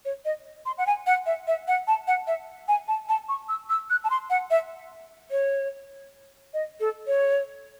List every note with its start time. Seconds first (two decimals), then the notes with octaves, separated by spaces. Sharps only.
0.05 C#5
0.25 D#5
0.66 C6
0.78 F#5
0.87 G#5
1.06 F#5
1.26 E5
1.47 E5
1.68 F#5
1.87 A5
2.07 F#5
2.27 E5
2.68 G#5
2.88 A5
3.09 A5
3.29 C#6
3.49 E6
3.70 E6
3.90 F#6
4.04 A5
4.10 C6
4.30 F#5
4.50 E5
5.31 C#5
6.54 D#5
6.80 A4
7.07 C#5